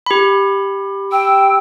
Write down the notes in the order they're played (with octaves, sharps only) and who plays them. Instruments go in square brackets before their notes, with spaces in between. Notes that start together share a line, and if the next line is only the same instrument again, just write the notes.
[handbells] G4 B5
[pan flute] G5 [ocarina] E6